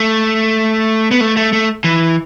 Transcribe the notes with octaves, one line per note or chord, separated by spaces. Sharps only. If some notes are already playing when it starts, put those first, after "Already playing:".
Already playing: A3
B3
A3
A3
A3
E3